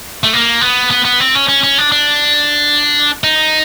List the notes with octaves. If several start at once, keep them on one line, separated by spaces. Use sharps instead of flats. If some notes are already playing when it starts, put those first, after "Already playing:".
A3
A#3
B3
B3
B3
C4
C#4
C#4
C#4
D4
D4
D#4